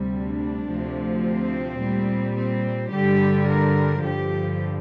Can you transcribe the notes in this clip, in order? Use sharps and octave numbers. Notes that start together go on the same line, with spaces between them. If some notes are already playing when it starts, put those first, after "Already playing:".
Already playing: D2 C3 G3
D4
D2 C3 F3
C4
A#2 G3
C4
G2 D3 G3 G4
A#4
G2 D3 F3 G4